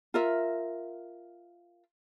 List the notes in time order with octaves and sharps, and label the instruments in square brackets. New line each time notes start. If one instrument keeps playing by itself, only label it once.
[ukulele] F4 A#4 E5